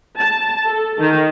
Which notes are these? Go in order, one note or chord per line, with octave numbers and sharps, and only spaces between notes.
A5
A4
D#3